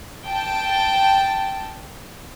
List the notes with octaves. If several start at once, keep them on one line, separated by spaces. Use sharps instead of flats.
G5 A5